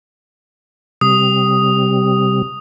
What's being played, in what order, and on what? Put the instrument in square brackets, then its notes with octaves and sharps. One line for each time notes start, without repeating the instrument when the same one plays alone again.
[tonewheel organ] C3 G3 [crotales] D#6